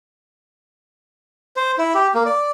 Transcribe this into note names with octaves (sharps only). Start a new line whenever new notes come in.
C5
E4
G4
A#3
D5